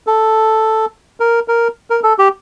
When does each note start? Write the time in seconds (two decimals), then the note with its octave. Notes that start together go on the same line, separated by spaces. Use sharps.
0.07 A4
1.20 A#4
1.48 A#4
1.90 A#4
2.03 A4
2.19 G4